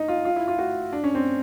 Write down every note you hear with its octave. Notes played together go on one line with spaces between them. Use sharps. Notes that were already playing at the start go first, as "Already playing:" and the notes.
Already playing: D#4
F4
F4
E4
F4
F#4
D4
C#4
C4